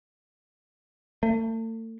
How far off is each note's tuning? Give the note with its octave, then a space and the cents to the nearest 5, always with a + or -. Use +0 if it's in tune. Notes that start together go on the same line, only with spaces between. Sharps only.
A3 +40